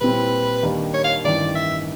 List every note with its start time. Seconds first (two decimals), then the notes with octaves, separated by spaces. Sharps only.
0.01 A#2 G3 C4 E4 B4
0.63 D#2 D#3 G3 A#3 D4
0.94 C#5
1.04 F5
1.24 A1 G2 D#3 D5
1.55 E5